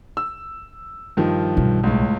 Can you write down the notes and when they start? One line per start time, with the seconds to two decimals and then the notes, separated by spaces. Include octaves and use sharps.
0.17 E6
1.17 G2 D#3 F3
1.57 B1 G3
1.84 C#2 A2